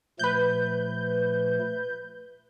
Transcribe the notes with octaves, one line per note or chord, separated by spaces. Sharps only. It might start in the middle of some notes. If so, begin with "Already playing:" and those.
A#2 F3 A3 B4 G6